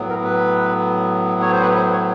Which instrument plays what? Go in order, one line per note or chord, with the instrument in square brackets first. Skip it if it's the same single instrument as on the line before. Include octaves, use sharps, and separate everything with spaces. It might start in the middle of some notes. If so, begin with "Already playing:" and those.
Already playing: [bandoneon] A2 F#3 B3
A#4
B4
C#5
C5
B4
C5
C#5